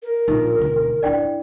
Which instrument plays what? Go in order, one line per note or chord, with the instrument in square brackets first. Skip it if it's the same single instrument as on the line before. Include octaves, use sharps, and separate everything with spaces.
[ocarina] A#4
[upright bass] A#1 F4 [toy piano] D#4
[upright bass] E1 D2
[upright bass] D4 E4 [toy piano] D5 G5